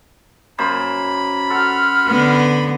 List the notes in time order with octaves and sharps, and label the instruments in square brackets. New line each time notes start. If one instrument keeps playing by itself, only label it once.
[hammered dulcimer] F#2 A#3 C5 [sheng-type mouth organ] B5
[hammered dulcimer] F#4 A4 [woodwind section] F#5 C6 F6
[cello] D3 B3